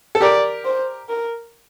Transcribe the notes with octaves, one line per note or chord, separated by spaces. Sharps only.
A4
G4 A#4 D5
C5
A#4